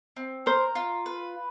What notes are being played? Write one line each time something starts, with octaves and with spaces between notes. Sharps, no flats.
C4
A#4 C5
F4
B4